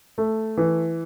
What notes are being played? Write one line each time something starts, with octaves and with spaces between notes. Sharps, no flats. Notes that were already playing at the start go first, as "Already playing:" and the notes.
A3
E3